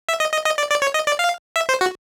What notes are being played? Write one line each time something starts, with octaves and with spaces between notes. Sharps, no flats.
E5
D#5
D#5
D#5
D5
D5
C#5
D#5
D5
F5
E5
C5
F#4